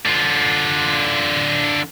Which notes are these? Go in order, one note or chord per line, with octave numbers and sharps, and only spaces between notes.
D3 F4